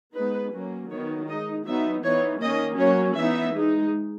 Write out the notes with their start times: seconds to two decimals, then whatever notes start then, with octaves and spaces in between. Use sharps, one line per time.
0.16 G#3 B3 D#4 B4
0.53 F#3 A#3 C#4
0.91 D#3 F#3 B3 C#5
1.28 G#3 D#4 D#5
1.66 F#3 B3 D#4 E5
2.03 E3 B3 D#4 C#5
2.42 D#3 A#3 C#4 D#5
2.79 F#3 A#3 C#4 C#5
3.16 E3 B3 D#4 E5
3.55 G#3 D#4